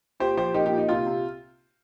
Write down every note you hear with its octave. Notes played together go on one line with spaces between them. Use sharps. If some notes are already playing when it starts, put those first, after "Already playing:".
A#2 G4 C5
F3 G4 C5
A#3 D#4 G4
D#4 G4
A#2
D#4
C3 F4
C3